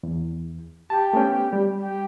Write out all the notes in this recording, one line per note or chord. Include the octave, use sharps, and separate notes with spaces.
E2
G4 A5
A3 B3 C#4
G3
G4